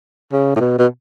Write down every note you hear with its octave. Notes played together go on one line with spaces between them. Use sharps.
C#3
A2
B2
B2